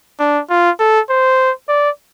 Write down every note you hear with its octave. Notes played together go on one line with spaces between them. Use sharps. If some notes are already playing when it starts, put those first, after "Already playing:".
D4
F4
A4
C5
D5